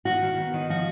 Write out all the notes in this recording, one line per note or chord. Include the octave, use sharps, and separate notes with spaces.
D#3 F#4
D#3
B3
D#3
F3 F#4